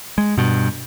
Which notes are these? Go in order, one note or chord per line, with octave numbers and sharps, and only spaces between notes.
G#3
G2 B2